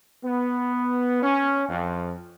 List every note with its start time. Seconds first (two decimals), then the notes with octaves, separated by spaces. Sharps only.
0.24 B3
1.23 C#4
1.69 F2